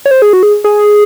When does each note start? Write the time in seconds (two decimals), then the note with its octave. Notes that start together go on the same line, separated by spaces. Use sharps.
0.06 C#5
0.11 C5
0.22 G#4
0.33 F#4
0.43 G#4
0.64 G#4